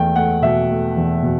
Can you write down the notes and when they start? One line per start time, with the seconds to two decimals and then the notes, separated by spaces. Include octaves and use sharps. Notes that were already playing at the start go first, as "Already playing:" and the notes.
Already playing: E2 A3 G5
0.16 A3 F#5
0.42 B2 E5
0.69 A3
0.97 E2
1.23 B2